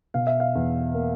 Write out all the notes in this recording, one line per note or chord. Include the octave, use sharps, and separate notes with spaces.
B2 F5
E5
F5
E2
A#3